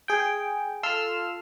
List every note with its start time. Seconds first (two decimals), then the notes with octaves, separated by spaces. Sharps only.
0.08 G#4 G5
0.83 F4 A4 C6 E6 F6